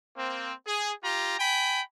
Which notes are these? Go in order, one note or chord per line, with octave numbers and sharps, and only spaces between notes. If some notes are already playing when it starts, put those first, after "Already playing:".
A#3 C4
G#4
F4 G4 A#5
G5 G#5 B5